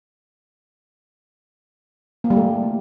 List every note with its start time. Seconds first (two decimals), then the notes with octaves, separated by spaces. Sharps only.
2.24 A#3
2.30 G3
2.37 A3